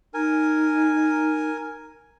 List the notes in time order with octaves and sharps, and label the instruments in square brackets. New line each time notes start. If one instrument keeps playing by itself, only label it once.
[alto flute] D#4 [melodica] A#4 G#5